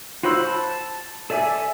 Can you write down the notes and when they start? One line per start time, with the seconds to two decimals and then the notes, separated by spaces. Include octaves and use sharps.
0.23 F4 F#4 C5 B5 E6
0.47 A5
1.30 A4 D5 E5 G#5